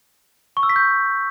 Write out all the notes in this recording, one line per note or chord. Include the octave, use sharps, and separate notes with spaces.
C#6
E6
B6
G6